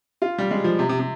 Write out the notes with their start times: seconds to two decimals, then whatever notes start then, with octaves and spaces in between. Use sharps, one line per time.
0.22 F4
0.38 G3
0.51 G#3
0.64 F3
0.79 C3
0.89 C3
0.99 C3